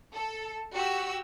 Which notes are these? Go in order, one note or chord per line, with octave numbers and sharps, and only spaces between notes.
A4
F#4 G4 E6